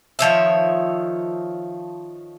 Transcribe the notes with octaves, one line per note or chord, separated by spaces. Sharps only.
D#3 F3 C#5 E5